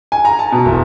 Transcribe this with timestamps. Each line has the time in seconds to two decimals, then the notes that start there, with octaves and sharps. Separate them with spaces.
0.12 G#5
0.25 A#5
0.39 A5
0.52 B2
0.65 E1